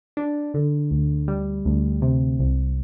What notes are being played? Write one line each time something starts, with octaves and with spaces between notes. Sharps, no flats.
D4
D3
D2
G3
D2
C3
C2